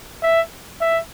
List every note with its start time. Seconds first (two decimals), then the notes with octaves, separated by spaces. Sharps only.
0.23 E5
0.81 E5